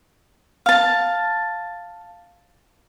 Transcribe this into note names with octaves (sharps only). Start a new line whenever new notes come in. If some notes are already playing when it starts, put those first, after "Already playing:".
F5 A5